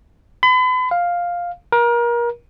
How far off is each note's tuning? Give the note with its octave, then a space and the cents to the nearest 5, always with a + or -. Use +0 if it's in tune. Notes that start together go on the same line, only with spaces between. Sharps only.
B5 +40
F5 +5
A#4 +30